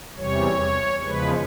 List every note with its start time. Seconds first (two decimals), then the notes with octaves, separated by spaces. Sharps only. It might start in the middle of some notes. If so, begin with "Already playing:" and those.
0.17 E2 C3 E3 G3 C#5
1.04 E2 C#3 F3 G#3 B4